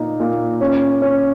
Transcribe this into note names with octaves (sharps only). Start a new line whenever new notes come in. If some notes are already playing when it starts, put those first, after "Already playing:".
Already playing: A#2 D#4
A#2
C#4
C#4